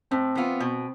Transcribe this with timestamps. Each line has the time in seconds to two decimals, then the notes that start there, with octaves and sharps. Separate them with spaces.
0.11 A2 C4
0.35 E3 B3 F4
0.60 B2